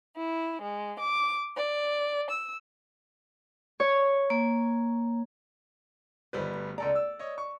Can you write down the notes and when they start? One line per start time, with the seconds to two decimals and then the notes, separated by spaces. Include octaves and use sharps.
0.15 E4
0.61 G#3
0.99 D6
1.57 D5
2.28 E6
3.80 C#5
4.30 A#3
6.33 G1 F2 D#3 G3 B4 C5
6.53 D2
6.78 C#2 A4 D5 A#5
6.95 E6
7.19 C#5 D#5
7.38 C#6